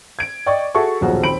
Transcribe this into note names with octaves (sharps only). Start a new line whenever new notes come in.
G#6 D7
D5 D#5 G5 C#6 D6
F#4 G#4 A4 E5 C#6
D#1 B1 F3 F#4 G#4
D#2 C4 B5 D7 F#7